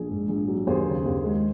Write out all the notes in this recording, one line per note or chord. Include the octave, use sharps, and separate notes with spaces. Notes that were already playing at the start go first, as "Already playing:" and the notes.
Already playing: A#1 G#4
G#2
A#1
F#3
D#2 G#4 C5
C#3
D#2
G#3